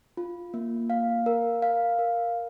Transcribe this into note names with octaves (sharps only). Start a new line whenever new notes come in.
F4
A#3
F5
A#4
F5
A#4